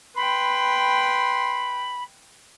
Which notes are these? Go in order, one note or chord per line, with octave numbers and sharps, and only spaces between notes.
B4 G5 B5 C6